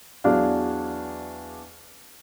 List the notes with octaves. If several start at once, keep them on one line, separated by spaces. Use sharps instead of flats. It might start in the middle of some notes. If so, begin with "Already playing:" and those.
E2 F#3 D4 G#4 D5 F5